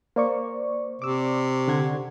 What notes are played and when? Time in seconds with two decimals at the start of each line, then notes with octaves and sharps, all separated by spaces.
0.16 A#3 C5 D5 C#6
1.02 C3 D6 E6
1.68 D3 F#5 G#6